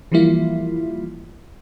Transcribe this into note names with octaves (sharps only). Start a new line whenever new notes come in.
E3 F3 G3 A#3 E4 F4